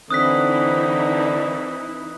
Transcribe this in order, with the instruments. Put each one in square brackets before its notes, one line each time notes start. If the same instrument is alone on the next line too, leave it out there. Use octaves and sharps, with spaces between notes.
[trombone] D3 [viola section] E3 D#4 E4 [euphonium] C4 [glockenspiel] D#6 F#6 B6